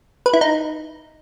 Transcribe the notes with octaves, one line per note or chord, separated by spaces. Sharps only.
B4
E4
D#4